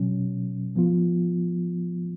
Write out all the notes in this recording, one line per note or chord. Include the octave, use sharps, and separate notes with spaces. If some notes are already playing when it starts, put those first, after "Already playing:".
Already playing: B2 F#3 C#4
F3 B3 F4